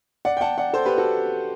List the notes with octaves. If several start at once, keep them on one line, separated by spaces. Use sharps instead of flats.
D5 F#5
G5
F#5 A5
D5 F#5
A4 C5
G4 B4
F#4 A4